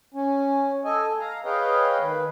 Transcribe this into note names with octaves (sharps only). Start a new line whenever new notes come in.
C#4
A4 D#5 G#5
F5 A#5
G#4 B4 C#5 D#5 F5 G5
D#3 B4